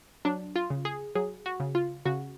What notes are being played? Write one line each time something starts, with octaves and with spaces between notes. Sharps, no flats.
F#3 D4
F4
C#3
G#4
F#3 G#4
F#4
C#3
F4
C#3 F#4